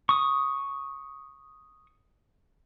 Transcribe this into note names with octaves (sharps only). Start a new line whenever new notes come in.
C#6 D#6